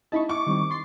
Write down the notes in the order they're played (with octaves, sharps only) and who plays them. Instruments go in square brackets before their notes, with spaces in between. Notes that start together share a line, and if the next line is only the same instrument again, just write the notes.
[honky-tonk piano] D#4 E4 D#5 [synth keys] A5 B5 C#6
[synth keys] E4 [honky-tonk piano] C#6 [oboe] D6
[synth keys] D#3 G3 C4
C6 A6 C7